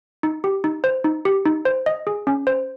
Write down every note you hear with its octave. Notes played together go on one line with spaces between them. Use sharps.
D#4
G4
D#4
C5
D#4
G4
D#4
C5
D#5
G#4
C#4
C5